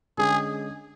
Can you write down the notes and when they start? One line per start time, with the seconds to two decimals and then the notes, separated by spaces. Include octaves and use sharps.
0.18 D3 G#3 C#4 G#4